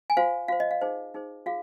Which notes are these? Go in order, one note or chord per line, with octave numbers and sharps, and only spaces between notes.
G#5
F4 C5 F5
F4 C5 F5
D#5
F5
D#4 G#4 C5
D#4 G#4 C5
F4 G#4 F5